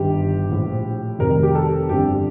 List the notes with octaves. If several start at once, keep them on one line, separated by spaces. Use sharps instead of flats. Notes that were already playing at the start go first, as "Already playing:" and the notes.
Already playing: G1 G2 D#3 G3 G4
A#1 A2 F3
F1 F2 C3 D#3 G3 A#4
G4
A4
G1 F2 D3 G3 G4